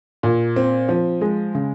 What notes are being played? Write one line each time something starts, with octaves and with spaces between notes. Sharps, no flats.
A#2
C4
F3
G#3
C#3